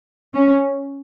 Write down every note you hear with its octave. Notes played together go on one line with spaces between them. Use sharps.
C#4